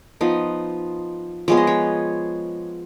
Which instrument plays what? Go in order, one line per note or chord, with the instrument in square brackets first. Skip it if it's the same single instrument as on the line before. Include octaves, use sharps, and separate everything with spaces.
[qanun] F3 B3 D#4
F3 G#3 B3 C#5
D#5
C#5